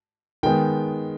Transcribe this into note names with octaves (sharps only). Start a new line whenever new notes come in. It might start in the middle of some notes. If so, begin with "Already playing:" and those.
D#3 G#3 B3 G5